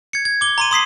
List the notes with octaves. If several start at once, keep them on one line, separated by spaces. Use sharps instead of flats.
G#6 C#7
G#6
D6 G7
A#5 C6 D#7
C6 D#6 B6 C7